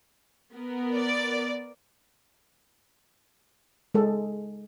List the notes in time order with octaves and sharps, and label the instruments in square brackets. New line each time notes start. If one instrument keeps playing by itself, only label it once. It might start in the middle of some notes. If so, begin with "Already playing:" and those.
[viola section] B3 A#4
[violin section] D5
[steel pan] G#3 A4